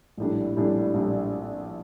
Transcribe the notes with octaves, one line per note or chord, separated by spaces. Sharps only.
A#1 A2 G3 D4
A#1 A2 G3 D4
A#1 A2 G3 D4